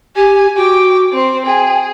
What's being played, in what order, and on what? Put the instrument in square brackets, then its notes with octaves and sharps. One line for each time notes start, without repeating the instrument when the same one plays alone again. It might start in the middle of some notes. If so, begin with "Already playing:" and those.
[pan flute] G4 [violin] G#5
[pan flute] F#4 [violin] G5 D6
[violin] C4 C5
[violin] G#4 [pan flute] G5